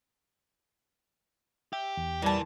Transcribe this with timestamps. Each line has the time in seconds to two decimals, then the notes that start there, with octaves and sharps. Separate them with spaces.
1.73 G4 E5
1.97 E2
2.22 A#2 E3 G3 A5